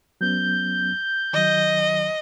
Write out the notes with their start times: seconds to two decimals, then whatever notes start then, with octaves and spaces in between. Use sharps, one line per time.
0.21 F#3 B3 C#4 G6
1.33 D#3 F#3 D#5